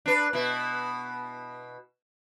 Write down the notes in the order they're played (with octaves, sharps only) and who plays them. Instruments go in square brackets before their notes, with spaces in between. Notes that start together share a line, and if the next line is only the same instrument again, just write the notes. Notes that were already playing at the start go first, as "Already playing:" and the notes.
[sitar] D4 B4
B2 E4